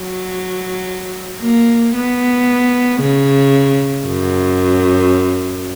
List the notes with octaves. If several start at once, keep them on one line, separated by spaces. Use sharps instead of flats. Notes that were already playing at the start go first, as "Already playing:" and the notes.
Already playing: F#3
A#3
B3
C#3
F#2